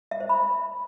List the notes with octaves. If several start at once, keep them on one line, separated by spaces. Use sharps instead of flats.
E5
C5
B5